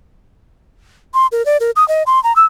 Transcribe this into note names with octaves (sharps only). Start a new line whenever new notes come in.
C6
A#4
D5
A#4
D#6
D#5
C6
A#5
E6